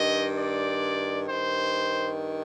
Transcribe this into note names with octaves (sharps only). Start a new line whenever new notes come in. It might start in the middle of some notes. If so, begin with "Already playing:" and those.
Already playing: G2 D#3 D#5
D5
G2 D#3 C5